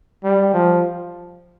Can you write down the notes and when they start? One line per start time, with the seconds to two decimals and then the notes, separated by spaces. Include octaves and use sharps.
0.24 G3
0.53 F3